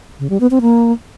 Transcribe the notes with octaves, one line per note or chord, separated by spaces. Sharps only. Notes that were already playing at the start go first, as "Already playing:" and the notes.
C#3
G3
B3
C4
A#3